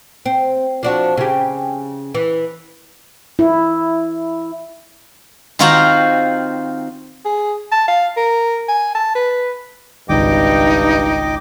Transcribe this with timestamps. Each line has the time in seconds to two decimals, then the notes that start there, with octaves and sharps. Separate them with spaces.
0.26 C4
0.83 F3 D4 F#4
1.17 C#3 G4
2.15 E3
3.39 E4
5.59 D#3 C4 F4 F#4 C5 A#5
7.25 G#4
7.72 A5
7.88 F5
8.17 A#4
8.68 G#5
8.95 A5
9.15 B4
10.09 G#1 C#2 G2 D#4 D#5 G5 D6